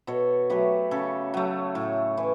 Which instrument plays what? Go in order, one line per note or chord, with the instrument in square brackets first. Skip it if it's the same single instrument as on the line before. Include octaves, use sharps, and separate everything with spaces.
[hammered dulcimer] B2 A4 C#5
F#3 A3 G4 B4
C#3 A4 C#5
F#3 A3
A2
E3